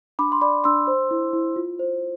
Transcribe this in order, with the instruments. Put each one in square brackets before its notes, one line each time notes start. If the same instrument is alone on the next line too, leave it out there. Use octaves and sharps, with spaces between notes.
[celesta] D4 B5 D6
C6
D5 B5 D6
D4 C6 E6
C5
E4
E4
F4
C5